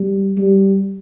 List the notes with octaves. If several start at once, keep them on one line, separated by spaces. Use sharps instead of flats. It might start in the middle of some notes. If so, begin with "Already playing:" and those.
Already playing: G3
G3